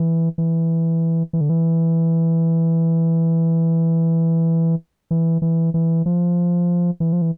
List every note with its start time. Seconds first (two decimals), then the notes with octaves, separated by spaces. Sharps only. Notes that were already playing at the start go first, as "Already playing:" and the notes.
Already playing: E3
0.38 E3
1.33 E3
1.41 D3
1.49 E3
5.11 E3
5.42 E3
5.74 E3
6.06 F3
7.00 E3
7.13 F3
7.22 E3